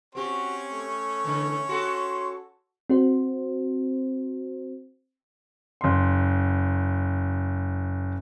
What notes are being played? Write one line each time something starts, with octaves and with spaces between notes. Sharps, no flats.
C4 C#4 F#4 G4 C#5
A3
D3 E3
F#4 A4 C6
C4 F#4 C5
F#1 C6